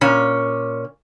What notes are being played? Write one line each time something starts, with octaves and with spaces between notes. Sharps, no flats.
A#2 C#4